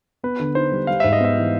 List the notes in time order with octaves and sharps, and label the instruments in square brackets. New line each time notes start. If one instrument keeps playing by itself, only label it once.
[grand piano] B3 [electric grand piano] B4
[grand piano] D3
[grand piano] D#4 [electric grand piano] C5
[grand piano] G3
[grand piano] G3 [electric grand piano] F5
[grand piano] G#2 [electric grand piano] E5
[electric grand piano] D#5
[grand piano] B3 [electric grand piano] E5
[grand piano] E3